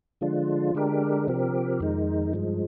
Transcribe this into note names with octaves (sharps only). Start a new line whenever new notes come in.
D3 F3 G#3 D4 F4
D3 G#3 D4 G4 A#4
C3 F3 C4 G4 A#4
F2 D#3 G#3 D#4
G2 F3 G#3